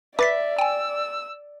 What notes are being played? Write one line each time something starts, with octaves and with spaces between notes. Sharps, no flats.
B4 D5 E5 D6 A6 B6
G5 G#5 E6